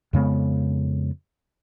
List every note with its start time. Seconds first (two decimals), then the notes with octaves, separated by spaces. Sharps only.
0.13 F2 C#3 G#3 B3